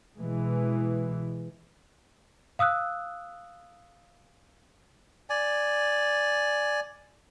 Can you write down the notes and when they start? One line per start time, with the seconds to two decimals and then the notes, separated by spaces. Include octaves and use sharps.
0.16 B2 E3 G#3
2.59 F5 D#6 E6 F#6
5.30 D5 G#5